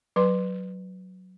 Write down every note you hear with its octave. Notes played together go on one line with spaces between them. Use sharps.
F#3 B4 C6